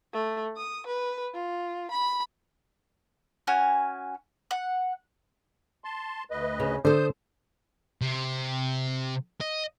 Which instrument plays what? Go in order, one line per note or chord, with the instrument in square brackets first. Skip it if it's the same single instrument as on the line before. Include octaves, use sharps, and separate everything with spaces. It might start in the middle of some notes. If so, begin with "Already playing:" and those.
[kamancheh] A3
D#6
B4
F4
B5
[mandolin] C#4 F#4 G#5 F6
F#5
[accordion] A5 C6
D2 B4 D#5
[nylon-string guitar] C#3
[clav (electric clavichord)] D3 [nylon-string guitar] A4 C5 [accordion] D#6 G6
[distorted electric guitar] C3
D#5